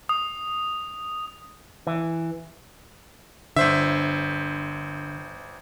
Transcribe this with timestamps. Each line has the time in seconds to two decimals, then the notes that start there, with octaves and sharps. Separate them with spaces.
0.09 D#6
1.87 E3
3.56 G1 D3 C5 E5